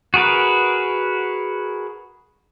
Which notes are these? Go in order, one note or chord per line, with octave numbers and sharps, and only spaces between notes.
F#4 G#4 A#4 B4